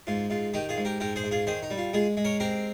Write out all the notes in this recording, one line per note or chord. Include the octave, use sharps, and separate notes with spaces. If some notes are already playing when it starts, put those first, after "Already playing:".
G#2 F4
G#2 F4
D#3 D#4 G4
F4 G#4
G#2
G4 A#4
G#2 G4 A#4
G#4 C5
G#2
F4 G#4
D#3 G#4 C5
D#4
G3
F4
G#3 F4 G#4
G#3
A#4 C#5
C4 G4 A#4